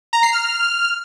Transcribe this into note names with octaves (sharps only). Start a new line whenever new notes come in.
A#5
C7
F6